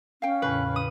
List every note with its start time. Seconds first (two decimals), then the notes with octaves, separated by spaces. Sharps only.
0.22 C#4 F5 G5
0.42 E2 A2 C#3 B4
0.76 D#6